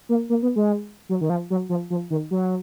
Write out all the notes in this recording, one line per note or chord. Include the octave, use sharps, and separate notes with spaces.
A#3
A#3
B3
G#3
F#3
D#3
F3
F#3
F3
F3
D#3
F#3